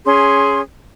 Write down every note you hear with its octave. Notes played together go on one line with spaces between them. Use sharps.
C#4 G#4 C6